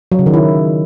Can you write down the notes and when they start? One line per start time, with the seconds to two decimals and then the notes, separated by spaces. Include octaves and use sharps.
0.12 F#3
0.19 C#3
0.26 D#3
0.34 E4